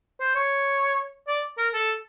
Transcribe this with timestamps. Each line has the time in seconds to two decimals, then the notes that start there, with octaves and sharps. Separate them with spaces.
0.20 C5
0.36 C#5
1.28 D5
1.58 A#4
1.74 A4